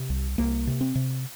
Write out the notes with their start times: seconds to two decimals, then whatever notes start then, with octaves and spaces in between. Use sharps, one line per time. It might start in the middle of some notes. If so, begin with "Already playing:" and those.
Already playing: C3
0.10 C2
0.38 C2 A#3
0.67 C3
0.81 C4
0.95 C3